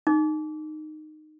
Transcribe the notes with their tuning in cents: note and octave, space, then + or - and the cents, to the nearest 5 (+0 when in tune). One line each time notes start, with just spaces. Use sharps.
D#4 -15 D6 -30